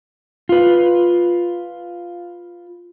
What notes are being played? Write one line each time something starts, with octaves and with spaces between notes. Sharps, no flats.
F4 B4